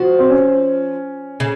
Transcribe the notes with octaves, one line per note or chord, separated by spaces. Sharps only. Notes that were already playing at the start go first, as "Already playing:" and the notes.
Already playing: F3 F#4
C4
C#4
C#3